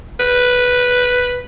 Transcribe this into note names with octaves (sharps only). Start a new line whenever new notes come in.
B4